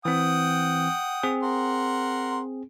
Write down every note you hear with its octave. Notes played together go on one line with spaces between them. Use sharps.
E3 C4 F#5 G5 D#6
C4 G#4
A#4 F#5 C6